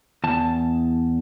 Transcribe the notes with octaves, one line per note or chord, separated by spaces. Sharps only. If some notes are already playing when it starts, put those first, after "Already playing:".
E2 A5